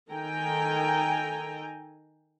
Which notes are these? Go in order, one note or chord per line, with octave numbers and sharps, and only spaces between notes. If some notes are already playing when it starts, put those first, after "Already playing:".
D#3 A4 G5 G#5 A#5